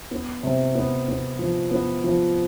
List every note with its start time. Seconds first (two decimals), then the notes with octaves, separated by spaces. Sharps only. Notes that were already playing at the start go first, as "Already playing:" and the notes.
0.11 B3
0.43 C3
0.75 B3
1.08 B3
1.39 F3
1.71 B3
2.04 F3